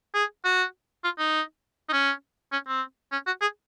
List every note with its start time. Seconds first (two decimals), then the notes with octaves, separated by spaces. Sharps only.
0.15 G#4
0.45 F#4
1.04 F4
1.19 D#4
1.89 D#4
1.93 C#4
2.53 C#4
2.68 C4
3.12 C#4
3.27 F#4
3.41 G#4